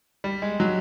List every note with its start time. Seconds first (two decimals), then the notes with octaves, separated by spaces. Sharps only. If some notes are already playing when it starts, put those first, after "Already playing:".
0.24 G3
0.42 G#3
0.60 F#3